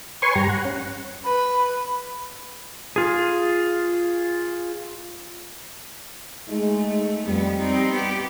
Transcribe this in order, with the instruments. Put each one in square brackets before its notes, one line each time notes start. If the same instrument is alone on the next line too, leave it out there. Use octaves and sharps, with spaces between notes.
[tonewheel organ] B4 C#5 G#5 C6 C#6
G2 G4 A#5
F#5
C#4
[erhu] B4
[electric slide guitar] F4 G#4
[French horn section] G#3 D#4 [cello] A3
[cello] F2 B3 [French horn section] G3
[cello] C4 D#4
B3 G4